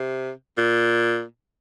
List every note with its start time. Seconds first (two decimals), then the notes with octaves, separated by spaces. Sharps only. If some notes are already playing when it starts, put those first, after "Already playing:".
Already playing: C3
0.58 A#2